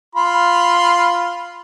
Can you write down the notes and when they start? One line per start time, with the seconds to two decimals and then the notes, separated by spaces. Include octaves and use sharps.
0.15 F4 B5 C6